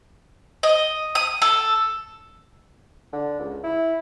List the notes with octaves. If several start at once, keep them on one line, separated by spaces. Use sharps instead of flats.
D#5
D#6
A4
D3
C#2
E4